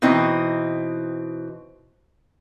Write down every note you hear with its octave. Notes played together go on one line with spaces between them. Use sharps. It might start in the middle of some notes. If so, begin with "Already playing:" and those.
B2 E3 C4 D#4